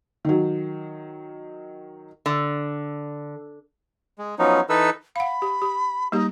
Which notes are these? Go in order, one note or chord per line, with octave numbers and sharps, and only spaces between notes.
D#3 F#3
D3
G#3
F3 F#3 B3 C#4 D#4
E3 D#4 A4 B4 E6
F5 F#5 B5
G4
G4
G3 A#3 D#4 G4